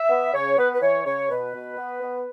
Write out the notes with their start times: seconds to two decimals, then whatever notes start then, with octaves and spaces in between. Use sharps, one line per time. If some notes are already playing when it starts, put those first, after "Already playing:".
Already playing: E5
0.10 B3
0.34 C#3 C#5
0.58 B3 B4
0.74 B4
0.82 E3 C#5
1.06 C#3 C#5
1.30 B2 B4
1.54 B2
1.78 B3
2.02 B3